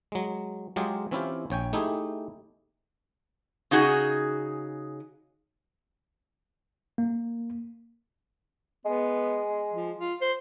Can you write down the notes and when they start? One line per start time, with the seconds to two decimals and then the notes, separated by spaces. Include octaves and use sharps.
0.12 F#3 G#3
0.76 F#3 G#3 F4 G4 G#4
1.11 E3 C4 C#4 E4 F4 G4
1.50 A#1 C#5 G5 G#5
1.73 A3 D#4 E4 G4 G#4
3.71 C#3 D#4 F#4 G#4
6.98 A#3
8.86 G#3 B3
9.73 F3
9.99 F4
10.21 C5